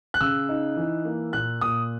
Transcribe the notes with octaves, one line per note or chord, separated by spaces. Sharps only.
F#6
C#3 E6
D#4
E3
A#3
A#2 F#6
A#2 D#6